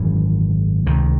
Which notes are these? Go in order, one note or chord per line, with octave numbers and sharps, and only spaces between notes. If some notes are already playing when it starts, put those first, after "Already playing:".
Already playing: G#1 F#2 C#3 E3
C#2 C3 D#3